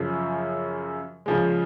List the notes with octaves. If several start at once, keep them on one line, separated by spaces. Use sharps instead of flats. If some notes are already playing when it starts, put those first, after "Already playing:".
Already playing: F#2 C#3 F3
C#3 F3 G#3